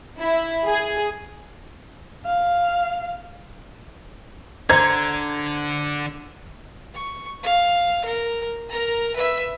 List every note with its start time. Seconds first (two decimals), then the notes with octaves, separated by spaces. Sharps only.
0.18 E4
0.66 G#4
2.25 F5
4.70 D3 C5 A#5 G#6
6.94 C#6
7.43 F5
8.04 A#4
8.70 A#4 A#5
9.15 B4 E5